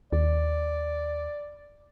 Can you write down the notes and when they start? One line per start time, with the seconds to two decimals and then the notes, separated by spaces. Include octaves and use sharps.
0.13 D#2 D5